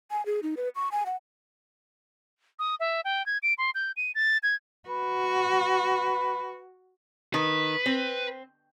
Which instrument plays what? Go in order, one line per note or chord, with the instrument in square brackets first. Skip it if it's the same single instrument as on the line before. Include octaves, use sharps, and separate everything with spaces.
[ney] G#5
G#4
D#4
B4
C#6
G#5
F#5
[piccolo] D#6
E5
G5
G#6
D7
C6
G6
D#7
A6
G#6
[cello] F#4 [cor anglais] B4
[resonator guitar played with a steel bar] D#3 [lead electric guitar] B4
[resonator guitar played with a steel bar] C4